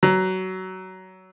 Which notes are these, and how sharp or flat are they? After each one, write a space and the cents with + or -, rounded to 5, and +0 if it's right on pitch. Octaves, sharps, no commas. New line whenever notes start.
F#3 +20